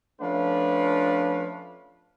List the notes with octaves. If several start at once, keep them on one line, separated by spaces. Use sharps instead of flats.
F3 A3 C#4 D4 B4 F5